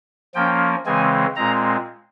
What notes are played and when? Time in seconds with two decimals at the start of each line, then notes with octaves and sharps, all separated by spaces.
0.35 F3 A#3 C#4 G5
0.86 C#3 E3 G#3 C4 G#5
1.36 A#2 G#3 C4 A#5